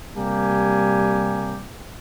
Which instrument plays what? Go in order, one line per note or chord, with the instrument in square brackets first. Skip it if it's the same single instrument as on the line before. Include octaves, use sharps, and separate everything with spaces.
[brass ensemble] C3 G3 A#3 G4 G#5